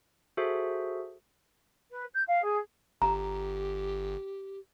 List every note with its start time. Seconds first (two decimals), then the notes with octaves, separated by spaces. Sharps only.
0.37 F#4 G#4 A4 C5 E5
1.90 B4
2.13 G6
2.27 F5
2.43 G#4
3.02 G1 G4 A#5